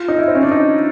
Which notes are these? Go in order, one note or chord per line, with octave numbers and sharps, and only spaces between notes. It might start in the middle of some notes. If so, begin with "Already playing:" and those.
Already playing: F4
D#4
E4
C4
C#4
D4
D#4